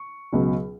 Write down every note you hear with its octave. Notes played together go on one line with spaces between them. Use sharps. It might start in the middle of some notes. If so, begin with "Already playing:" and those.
Already playing: C#6
C#2 B2 F#3